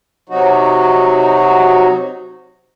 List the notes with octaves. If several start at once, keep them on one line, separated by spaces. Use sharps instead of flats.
C3 F#3 D#4 F#4